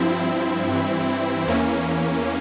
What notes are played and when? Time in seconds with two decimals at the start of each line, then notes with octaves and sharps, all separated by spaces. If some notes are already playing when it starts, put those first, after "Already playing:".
Already playing: G2 F3 C4 E4
0.68 G2 E3
1.47 E2 E3 A#3 C#4